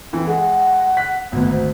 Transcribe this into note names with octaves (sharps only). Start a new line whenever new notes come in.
E3 C4
G#3 G#4 F#5
F#6 B6
G#1 D2 B3
C5